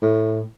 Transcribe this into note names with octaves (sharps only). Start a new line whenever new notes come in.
A2